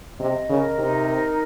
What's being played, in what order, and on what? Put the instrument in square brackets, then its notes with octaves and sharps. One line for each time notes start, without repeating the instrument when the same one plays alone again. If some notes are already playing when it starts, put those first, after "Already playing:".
[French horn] C3 [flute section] D#5
[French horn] C#3 [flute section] A#4
[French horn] C3 [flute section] D#4
[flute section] A#4